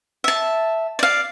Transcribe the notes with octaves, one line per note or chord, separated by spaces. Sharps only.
E5 A5
D5 F5